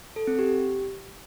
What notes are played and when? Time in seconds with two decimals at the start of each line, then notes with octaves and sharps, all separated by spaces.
0.16 A4
0.27 C4
0.39 G4